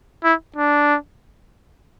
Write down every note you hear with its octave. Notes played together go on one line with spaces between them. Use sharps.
E4
D4